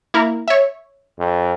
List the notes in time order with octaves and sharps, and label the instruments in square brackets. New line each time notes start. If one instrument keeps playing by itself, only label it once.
[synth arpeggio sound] A#3 E4 A#4
C#5 E5
[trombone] F2